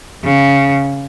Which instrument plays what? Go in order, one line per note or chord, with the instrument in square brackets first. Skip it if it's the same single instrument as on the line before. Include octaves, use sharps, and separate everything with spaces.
[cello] C#3